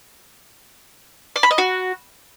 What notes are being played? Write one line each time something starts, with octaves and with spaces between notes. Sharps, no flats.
D5
B5
D#5
F#4